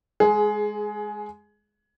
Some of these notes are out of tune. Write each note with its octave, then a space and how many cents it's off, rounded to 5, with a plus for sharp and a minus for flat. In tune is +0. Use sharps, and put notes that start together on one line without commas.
G#3 +0 G#4 +20